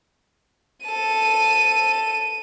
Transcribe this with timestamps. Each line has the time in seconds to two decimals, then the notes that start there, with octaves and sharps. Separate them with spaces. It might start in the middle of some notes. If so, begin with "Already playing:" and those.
0.86 A4 D#7